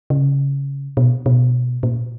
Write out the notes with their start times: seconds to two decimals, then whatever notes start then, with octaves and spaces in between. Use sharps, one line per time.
0.10 C#3
0.97 B2
1.26 B2
1.83 A#2